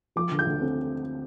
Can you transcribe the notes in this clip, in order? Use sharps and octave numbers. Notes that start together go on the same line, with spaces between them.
F3 D6
D3
G6
D2
C4